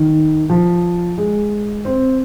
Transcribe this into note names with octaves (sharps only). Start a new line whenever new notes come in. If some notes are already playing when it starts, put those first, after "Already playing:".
Already playing: D#3
F3
G#3
C4